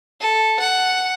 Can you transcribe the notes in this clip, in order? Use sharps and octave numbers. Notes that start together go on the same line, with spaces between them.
A4
F#5